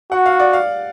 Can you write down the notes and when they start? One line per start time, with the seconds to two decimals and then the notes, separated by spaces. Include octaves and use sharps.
0.11 F#4 F#5
0.26 F5
0.40 D5
0.53 F5